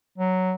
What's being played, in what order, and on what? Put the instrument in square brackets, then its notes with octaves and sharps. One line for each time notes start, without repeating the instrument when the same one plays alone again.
[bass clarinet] F#3